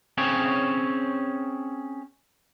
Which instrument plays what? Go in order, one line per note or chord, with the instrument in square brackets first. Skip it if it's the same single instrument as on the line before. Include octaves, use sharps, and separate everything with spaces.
[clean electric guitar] C4 C#4 G#4 C#5